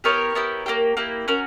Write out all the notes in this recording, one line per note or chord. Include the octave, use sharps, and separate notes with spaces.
B3 E4 G4 A#4 C#5
B3 E4 G4
A#3 E4 G4
A#3 E4 G4
C#4 F#4 A#4